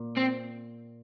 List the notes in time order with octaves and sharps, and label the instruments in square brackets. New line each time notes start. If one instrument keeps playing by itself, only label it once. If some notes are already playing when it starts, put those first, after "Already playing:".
Already playing: [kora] A#2
[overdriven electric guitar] C4